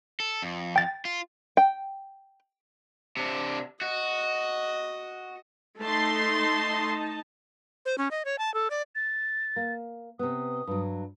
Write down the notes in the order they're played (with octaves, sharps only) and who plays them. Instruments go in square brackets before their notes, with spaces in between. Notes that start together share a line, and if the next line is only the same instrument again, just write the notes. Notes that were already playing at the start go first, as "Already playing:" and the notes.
[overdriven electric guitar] A4
F2
[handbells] G5 A6
[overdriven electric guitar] F4
[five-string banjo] G5
[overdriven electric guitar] C3 D4
[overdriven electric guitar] F#4 [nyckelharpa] D#5
[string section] A3 C6 [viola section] D#4 A5
[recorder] C5
C#4
D#5
C#5
A5
A4
D5
[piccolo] A6
[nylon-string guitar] A#3
[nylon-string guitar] C3 B3 [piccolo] D#6
[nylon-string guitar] G2 F#3